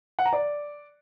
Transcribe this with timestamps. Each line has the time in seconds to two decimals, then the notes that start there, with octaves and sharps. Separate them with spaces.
0.19 F#5
0.25 A#5
0.32 D5